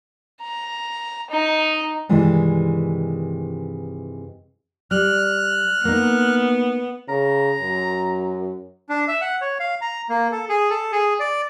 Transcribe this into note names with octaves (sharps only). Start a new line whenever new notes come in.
A#5
D#4
G2 C3 D#3 E3 G3 G#3
G3 F6 F#6
A#3 B3 D#4
C#3 A#5
F#2
D4
E5
F#5
C#5
F5
A#5
A#3
A4
G#4
A4
G#4
D5